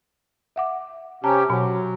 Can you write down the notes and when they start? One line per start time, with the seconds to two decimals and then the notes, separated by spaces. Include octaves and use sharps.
0.56 E5 F#5 D6
1.24 C3 C#4 G4 A5 A#5
1.50 B2 F#3